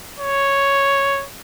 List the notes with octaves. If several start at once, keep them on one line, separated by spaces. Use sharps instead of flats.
C#5